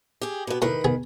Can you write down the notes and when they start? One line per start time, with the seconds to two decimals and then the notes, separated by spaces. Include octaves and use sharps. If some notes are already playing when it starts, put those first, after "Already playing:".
0.21 G4 G#4
0.47 B2 B3
0.62 A2 D#3 B4
0.84 B3 G#4